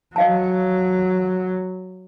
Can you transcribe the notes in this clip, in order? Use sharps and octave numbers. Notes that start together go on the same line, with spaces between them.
F#3 D#5 F5 A5